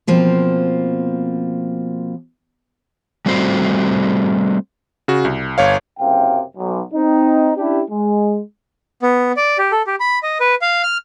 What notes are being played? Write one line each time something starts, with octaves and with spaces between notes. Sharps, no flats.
B2 F3 A#3 C4
G3 A3 C4 F#4 C5
C#3 F#4
C2
G1 C#5 F5
F#1 F#2 C3 F5 G5
B1
C4 D#4
C#4 D4 E4 G4
G#3
B3
D5
G4
A4
G4
B5
D#5
B4
F5
F6